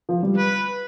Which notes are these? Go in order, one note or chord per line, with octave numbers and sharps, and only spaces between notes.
F3
G3
B4